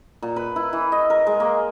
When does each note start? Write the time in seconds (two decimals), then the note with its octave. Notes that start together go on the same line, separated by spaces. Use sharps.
0.22 A#2
0.36 B4
0.56 E4
0.73 E3
0.92 D#5
1.10 A#4
1.27 G#3
1.40 A#3